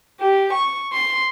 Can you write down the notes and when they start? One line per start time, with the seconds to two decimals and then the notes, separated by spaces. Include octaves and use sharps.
0.20 G4
0.52 C#6
0.91 C6